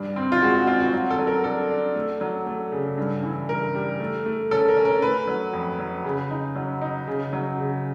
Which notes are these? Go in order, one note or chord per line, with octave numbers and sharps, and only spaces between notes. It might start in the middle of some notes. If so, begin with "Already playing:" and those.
Already playing: G2 D4
C4
F4
G#3 F#4
F#4
C4 F4
F#4
F#3
A4
F#3
A#4
D4 A4
D4
A3
F#3
A3
C#3
G2
E3
G2 A#4
G3
A3
A3
C#4 A4
A#4
C#4
A#4
A3 B4
F#3
F2
F#3
C#3
D#4
F#3
D#4
C#3
F#3
C#3